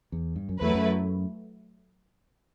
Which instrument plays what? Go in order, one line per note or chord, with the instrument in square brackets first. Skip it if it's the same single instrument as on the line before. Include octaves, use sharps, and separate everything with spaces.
[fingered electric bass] E2
G2
F#2
[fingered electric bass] E2 [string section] F#3 A3 E4 B4
[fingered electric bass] F#2